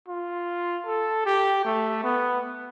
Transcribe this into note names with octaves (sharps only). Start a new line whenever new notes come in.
F4
A4
G4
A3
B3